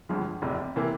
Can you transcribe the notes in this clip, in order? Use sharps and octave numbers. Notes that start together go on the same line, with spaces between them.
G1 G2 F3 G#3
F1 E2 C3
C3 E3 A#3